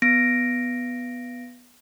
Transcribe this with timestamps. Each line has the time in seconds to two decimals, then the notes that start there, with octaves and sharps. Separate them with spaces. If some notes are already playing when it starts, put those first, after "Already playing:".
0.02 B3 A#6 D7